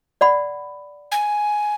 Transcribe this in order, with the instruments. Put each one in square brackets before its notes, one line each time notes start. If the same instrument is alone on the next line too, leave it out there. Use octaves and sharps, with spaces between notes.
[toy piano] D5 F#5 B5
[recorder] G#5